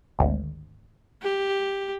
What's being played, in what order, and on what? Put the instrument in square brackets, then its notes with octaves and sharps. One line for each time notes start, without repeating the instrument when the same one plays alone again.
[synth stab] G#1 D2
[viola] G4